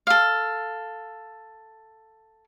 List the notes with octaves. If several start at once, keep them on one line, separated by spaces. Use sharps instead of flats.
A4 F5